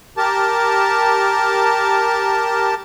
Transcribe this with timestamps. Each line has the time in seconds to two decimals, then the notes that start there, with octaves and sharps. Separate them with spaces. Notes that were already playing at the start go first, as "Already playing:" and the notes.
0.17 G4 A#4 A5